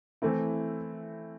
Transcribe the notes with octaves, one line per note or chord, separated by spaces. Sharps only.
E3 A3 C4 E4